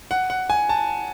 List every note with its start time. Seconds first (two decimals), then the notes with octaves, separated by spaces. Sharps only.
0.11 F#5
0.30 F#5
0.50 G#5
0.69 A5